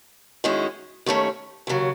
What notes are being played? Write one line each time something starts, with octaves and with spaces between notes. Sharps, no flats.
F#2 D#3 G#3 C#4 E4
D#2 D#3 A3 C#4
D#2 C#3 F#3